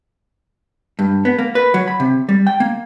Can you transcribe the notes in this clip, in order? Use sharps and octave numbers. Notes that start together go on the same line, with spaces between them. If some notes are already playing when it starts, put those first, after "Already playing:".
G2
B3
A#3
B4
F#3
B5
C3
G3
G5
A#3